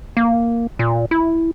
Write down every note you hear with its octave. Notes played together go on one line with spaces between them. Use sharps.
A#3
A#2
E4